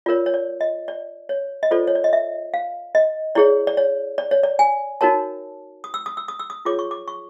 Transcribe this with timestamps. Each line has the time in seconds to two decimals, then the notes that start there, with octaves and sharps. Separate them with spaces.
0.06 F4 A#4 C#5 D5
0.26 C#5
0.34 D5
0.61 D#5
0.88 D5
1.29 C#5
1.63 D#5
1.71 F4 A4 C5 D5
1.87 C#5
1.95 D5
2.04 D#5
2.13 E5
2.54 F5
2.95 D#5
3.35 E4 G#4 C#5 D5
3.67 D5
3.77 C#5
4.18 D5
4.31 C#5
4.43 D5
4.59 G#5
5.01 D#4 F#4 A#4 C#5 A5
5.84 D#6
5.94 E6
6.06 D#6
6.17 E6
6.28 D#6
6.39 E6
6.50 D#6
6.65 F4 G#4 C#5 D6
6.79 C#6
6.91 D6
7.08 C#6